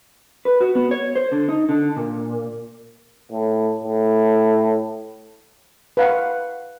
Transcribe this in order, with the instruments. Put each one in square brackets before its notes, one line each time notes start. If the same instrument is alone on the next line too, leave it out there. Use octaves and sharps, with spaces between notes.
[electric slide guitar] B4
F#4
B3
C#5
C5
D3
D#4
D3
A#2
[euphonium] A2
A2
[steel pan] B4 F5 F#5